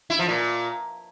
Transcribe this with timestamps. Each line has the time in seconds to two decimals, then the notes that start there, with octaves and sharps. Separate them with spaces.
0.10 E4
0.19 F3
0.29 A#2